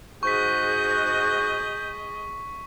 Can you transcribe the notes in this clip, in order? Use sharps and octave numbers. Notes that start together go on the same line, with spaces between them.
G#2 F#4 G#4 D#5 C#6 G6 B6